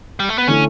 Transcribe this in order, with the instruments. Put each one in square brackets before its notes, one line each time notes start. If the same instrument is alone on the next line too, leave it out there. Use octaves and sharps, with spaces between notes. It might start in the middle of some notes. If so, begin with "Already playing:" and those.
[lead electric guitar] G3
A3
B3
[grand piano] D3 A3 E4 [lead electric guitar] C#4